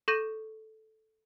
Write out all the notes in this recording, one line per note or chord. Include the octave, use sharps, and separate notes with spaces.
A4 C#6 G6 A#6 D#7